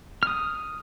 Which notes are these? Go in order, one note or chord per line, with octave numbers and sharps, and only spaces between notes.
D#6 F6